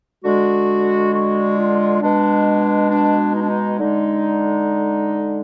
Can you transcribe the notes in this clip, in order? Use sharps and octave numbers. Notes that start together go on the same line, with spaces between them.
D3 G#3 F#4
F#4
F4
B2 G#3 D4
D4
D#4
D4
D#4
D3 G#3 D#4